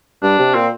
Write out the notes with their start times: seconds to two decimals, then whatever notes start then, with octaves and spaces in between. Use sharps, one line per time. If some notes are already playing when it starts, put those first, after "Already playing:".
0.22 G2 D4
0.39 C3
0.54 A#2 C4